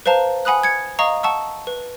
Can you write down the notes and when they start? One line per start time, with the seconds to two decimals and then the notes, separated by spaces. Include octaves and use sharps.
0.06 B4 C5 F5 A5 A#5
0.45 F#5 G#5 B5 D#6 F#6
0.63 G#6 C#7
0.99 D#5 F5 A#5 C#6 D#6
1.23 F#5 A5 C#6 E6
1.67 B4